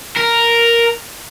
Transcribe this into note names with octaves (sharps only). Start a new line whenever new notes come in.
A#4